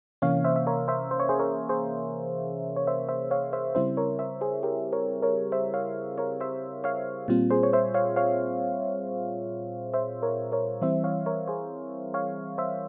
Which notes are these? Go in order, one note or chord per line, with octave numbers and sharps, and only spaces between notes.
C3 E3 A#3 C#4 C#5 F5
C5 E5
E5
A#4 C#5
C5 E5
C5
C#5
G#4 C5
A#4 C#5
G#4 C5
C#5
C5 E5
C5 E5
C#5 F5
C5 E5
C#3 G3 C4 E4 C5 E5
A#4 C#5
C5 E5
G#4 C5
G4 A#4
A#4 C#5
A#4 C#5
C5 E5
C#5 F5
A#4 C#5
C5 E5
C#5 F5
A#2 G3 C4 F4
G#4 C5
C#5
C5 E5
C#5 F5
C#5 F5
C5 E5
A#4 C#5
A#4 C#5
E3 G3 C4 E4 C5 E5
C#5 F5
A#4 C#5
G#4 C5
C#5 F5
C5 E5